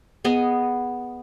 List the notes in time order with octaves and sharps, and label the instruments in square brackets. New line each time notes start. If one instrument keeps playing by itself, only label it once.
[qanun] B3 G#4 D#5